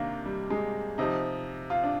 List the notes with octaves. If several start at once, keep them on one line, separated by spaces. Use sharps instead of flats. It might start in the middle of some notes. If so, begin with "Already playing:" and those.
Already playing: C3 D#3 A#3 D4
G3
G#3
C3 F3 D#4
F4
D4